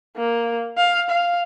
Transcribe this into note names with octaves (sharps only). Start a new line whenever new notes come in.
A#3
F5
F5